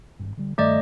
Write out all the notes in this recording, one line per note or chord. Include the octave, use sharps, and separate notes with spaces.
G#1 G2
D3 G3
G2 D#3 G3 A3 D5 D#5